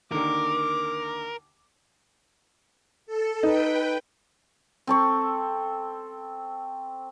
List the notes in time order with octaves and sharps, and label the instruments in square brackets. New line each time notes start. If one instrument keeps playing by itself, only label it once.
[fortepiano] D#2 D3 D#3 [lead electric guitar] A#4 [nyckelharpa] D6
[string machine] A4
[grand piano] D#4 [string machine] B4 G5
[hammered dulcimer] C4 A4 C#6